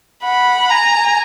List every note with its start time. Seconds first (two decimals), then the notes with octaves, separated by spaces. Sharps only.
0.24 F#5 B5
0.70 G#5 A#5